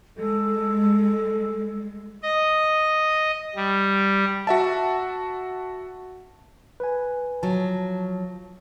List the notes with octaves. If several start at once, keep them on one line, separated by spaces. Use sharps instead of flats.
G#3 A4
D#5
G3
F#4 E5 A5
B4 G#5
F3 F#3 A5